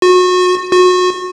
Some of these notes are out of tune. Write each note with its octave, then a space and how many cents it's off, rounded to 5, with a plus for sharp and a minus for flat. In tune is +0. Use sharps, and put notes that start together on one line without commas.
F#4 -30
F#4 -30